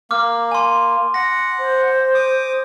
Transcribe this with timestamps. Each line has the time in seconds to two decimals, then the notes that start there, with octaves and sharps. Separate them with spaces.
0.11 A#3 D6 F6
0.51 G#5 C6
1.14 F#5 A#6
1.60 C5
2.15 D6 D#6